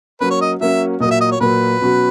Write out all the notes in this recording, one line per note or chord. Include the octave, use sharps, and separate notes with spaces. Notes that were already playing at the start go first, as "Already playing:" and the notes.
F#3 A#3 C#4 B4
C#5
D#5
F#3 A#3 C#4 E5
A#2 F#3 A#3 D#5
E5
D#5
C#5
A#2 F#3 A#3 B4
B2 F#3 C#4 F#4